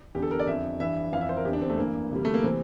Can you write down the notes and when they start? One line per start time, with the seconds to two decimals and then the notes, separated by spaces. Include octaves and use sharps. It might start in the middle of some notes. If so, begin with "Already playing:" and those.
0.15 E2 G4
0.19 D3 A4
0.31 A#4
0.39 D5
0.47 F2 D3 E5
0.80 G2 E3 E5
1.12 F2 E3 F5
1.21 E5
1.29 C5
1.37 A#4
1.45 E2 D3 G4
1.53 D4
1.62 C4
1.70 A3
1.78 G2 E3 A#3
2.11 D2 C3 E3 G3
2.25 A3
2.34 A#3
2.43 C3 E3 C4